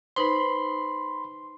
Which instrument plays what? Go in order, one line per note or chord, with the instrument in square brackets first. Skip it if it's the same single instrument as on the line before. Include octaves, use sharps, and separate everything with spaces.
[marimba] D#4 B4 C5 [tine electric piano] B5 C6